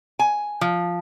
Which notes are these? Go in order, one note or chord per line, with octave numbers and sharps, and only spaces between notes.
G#5
F3